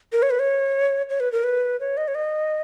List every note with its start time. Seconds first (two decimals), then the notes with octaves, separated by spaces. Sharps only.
0.13 A#4
0.22 C#5
0.30 B4
0.39 C#5
1.09 C#5
1.20 B4
1.32 A#4
1.44 B4
1.80 C#5
1.97 D#5
2.08 C#5
2.15 D#5